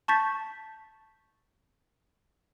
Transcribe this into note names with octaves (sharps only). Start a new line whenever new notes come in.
A5 C#6 G6 A6 B6